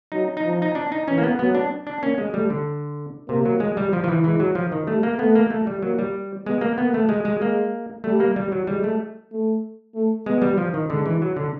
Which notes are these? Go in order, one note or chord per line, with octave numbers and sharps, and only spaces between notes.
F#3 D#4
D#4
F3
D#4
D4
D#4
E3 C#4
A#3
B3
F#3 B3
D4
D4
A#3 C#4
G#3
G3 A3
D3
C3 A#3
F#3
G#3
G3
F3
F3
E3
E3 G#3
F#3
F3
D#3
G3 A3
A#3
A3 B3
A#3
A3
G3
F#3 A#3
G3
G#3 B3
A#3
A#3 B3
A3
G#3
G#3
G#3 A#3
G3 A3
A#3
G3
F#3
G3 G#3
A3
A3
A3
G#3 B3
G3
F3
D#3
D3 G#3
E3
F#3
D3